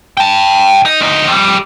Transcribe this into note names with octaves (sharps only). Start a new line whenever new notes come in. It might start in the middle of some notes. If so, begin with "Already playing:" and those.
G5 A5
D#4
D2 D#4
F2 G3